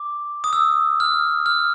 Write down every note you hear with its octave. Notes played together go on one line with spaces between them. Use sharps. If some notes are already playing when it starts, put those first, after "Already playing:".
Already playing: D6
D#6
E6
F6
F6